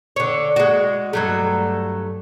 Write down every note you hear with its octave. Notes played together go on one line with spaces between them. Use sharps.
D3 C#5
G#3 F#4
G2 F#3 A3